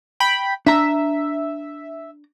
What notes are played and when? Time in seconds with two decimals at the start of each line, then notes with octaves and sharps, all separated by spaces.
0.20 G5 B5
0.67 D4 E5 A#5